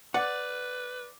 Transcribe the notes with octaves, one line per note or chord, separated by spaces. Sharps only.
B4 D5 F#5